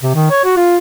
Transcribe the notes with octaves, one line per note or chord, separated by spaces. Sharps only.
C3
D#3
C#5
F#4
F4